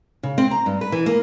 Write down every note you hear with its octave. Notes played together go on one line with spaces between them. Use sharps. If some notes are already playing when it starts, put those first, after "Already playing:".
C#3
C4
A#5
G2
B4
E3
A#3